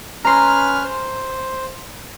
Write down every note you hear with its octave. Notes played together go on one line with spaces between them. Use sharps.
C#4 B4 A#5 C6 F6
C5